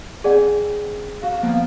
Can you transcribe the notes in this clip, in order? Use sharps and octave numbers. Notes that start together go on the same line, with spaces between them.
C4 G#4 D5 F#5 G#5
F#4 F5
F3 A#3 B3